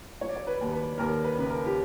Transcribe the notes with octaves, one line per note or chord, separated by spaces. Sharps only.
F#3 C#5
D5
C#5
B4
D#2
B4
D#2 A#4
B4
C#3 B4
A#4
G4